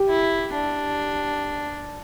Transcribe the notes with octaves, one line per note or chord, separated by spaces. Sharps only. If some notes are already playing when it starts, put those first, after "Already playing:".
Already playing: G4
E4
D4